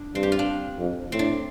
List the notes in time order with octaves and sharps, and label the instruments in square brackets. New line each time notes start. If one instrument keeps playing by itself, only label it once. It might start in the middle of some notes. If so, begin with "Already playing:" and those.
Already playing: [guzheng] D4
[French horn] G2 [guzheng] C4
[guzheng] G4
F4
D4
[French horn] F2
[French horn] A2 [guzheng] C4
[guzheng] D4